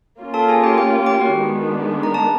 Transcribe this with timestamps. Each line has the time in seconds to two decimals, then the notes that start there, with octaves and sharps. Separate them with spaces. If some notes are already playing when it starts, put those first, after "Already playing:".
0.20 A#3 C#4 F4
0.34 A4 A5
0.48 G#4 G#5
0.63 G4 G5
0.78 G4 G5
1.06 G4 G5
1.21 F#4 F#5
1.35 D#3 G#3 B3 D4
2.03 A#5
2.14 A5